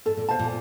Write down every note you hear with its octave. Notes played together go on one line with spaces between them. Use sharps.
G#2 A4
A#2
B2 C5 F5 A5
A#2